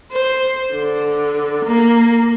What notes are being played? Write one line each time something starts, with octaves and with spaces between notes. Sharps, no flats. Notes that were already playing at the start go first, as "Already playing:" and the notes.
C5
D3
A#3